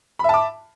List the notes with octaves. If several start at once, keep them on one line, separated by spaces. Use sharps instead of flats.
E5 A5 B5 D6